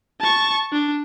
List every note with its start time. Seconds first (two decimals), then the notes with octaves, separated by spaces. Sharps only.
0.20 A5 C#6
0.72 D4